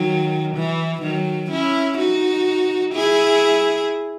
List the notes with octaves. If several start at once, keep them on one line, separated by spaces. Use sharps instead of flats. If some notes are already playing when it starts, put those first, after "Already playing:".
Already playing: D#3 F#3
E3
D#3 F#3
C#4 E4
D#4 F#4
E4 G#4